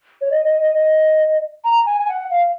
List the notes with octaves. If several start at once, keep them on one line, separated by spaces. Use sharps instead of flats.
C#5
D#5
D#5
D#5
D#5
A#5
G#5
G#5
F#5
F5